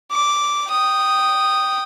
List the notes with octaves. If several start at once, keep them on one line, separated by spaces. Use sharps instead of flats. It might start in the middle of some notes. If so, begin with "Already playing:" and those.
D6
G5 D#6